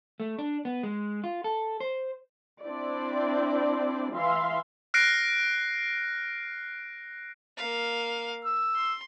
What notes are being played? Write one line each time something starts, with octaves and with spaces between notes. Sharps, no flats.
A3
D4
B3
G#3
F4
A4
C5
C4 D4 E4 D5
E3 E5 F5 C6
F6 F#6 A#6 C7 D7
A#3 F5
E6
C6